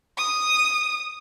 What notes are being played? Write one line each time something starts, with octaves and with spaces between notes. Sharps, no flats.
D#6